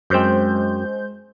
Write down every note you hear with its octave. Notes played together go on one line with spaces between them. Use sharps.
F#2 G#3 C4 C5 G6